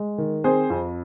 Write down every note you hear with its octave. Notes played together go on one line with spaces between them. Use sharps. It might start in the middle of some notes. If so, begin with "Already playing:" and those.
Already playing: G#3
D#3
C4 G#4 C5
F2